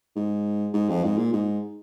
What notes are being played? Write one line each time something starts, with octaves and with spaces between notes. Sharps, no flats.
G#2
G#2
F2
G#2
A#2
G#2